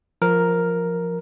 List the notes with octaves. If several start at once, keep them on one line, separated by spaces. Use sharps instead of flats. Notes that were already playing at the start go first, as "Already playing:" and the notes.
F3 A#4